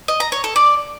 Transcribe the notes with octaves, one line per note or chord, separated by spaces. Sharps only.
D#5
A#5
C#5
A4
D5